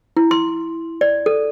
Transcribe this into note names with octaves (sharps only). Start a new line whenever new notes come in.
E4
C6
D5
A4